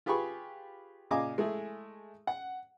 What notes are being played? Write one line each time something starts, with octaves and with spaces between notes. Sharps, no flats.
F4 G4 G#4 B4 B5 C#6
A#2 C#3 D#5 F5 G#5 D6
G#3 A3 E4 G#4
F#5